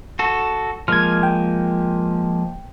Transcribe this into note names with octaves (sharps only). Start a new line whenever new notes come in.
F#4 A4
F3 G#3 A#3 F6 G#6
G5